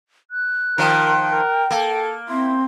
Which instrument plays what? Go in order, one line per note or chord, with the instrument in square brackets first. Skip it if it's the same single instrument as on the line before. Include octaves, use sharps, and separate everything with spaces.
[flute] F#6
[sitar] D#3 F3 [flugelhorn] A#4 [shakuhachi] G5
[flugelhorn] A#4
[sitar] A#3 [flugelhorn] A4
[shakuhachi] C4 [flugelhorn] E4 [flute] C6